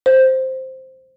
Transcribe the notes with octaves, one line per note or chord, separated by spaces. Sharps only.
C5